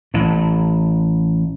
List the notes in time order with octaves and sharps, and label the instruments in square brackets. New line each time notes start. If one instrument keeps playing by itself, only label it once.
[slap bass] A1 A2